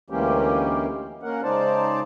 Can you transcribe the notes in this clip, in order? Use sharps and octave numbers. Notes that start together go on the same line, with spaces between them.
D2 E3 G#3 A#3 C#4 G4
A#3 C#4 A#4 F#5
C#3 G#3 D#4 C5 D5 A5